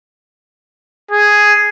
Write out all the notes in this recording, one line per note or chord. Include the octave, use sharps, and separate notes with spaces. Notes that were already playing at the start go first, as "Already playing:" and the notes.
G#4